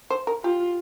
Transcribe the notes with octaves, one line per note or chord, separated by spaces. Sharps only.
C5
A#4
F4 G4